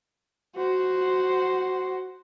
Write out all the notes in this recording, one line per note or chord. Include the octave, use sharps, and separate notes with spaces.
F#4 C5